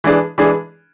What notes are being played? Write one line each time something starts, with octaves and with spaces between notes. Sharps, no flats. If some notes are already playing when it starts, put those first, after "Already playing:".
E3 G#3 D4 G#4
E3 G#3 D4 G#4